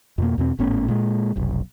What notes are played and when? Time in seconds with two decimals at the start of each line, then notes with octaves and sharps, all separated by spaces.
0.18 F2 B2 A#3
0.38 E2 B2 C4
0.59 G#1 A2 B3 C#4
0.88 A#2 G#3
1.36 F1 B1